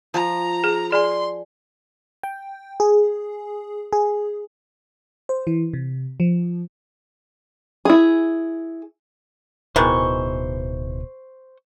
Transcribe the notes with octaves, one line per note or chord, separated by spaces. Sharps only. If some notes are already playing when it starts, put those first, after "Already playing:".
F3 A#5
G#4
G#4 D5 G#5 C6
G5
G#4
G#4
C5
E3
C3
F3
E4 G#4
D1 B2 D#3 E3 G#3 C5 C#6